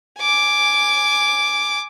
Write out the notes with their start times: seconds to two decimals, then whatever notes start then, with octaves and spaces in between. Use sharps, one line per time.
0.19 G#5 D6